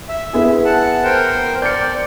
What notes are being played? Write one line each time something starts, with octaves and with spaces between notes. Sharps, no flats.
E5
B3 E4 G#4
F#5 A5
A#4 C5 G5
D5 G6 C#7